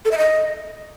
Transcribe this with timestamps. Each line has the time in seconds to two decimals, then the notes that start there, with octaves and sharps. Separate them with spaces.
0.05 A4
0.11 E5
0.18 D#5